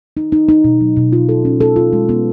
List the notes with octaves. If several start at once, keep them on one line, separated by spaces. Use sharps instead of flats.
D#4
D#4
D#4
B2
F#3
B2
F4
A4
C#4
A4
F4
G#3
B3